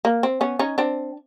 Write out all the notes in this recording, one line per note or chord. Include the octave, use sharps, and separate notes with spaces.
A#3
C4
B3 C#4
C#4 D#4
C4 D4